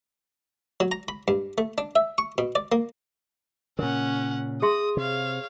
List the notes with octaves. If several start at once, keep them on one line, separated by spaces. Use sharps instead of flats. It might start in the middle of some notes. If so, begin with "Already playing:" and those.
F#3
A#5
B5
G2
A3
D4
E5
C#6
B2
D5
A#3
A#2 C#3 C#4 A#4 F#5
G#4 E5 C6 D#6
C3 C#5 F5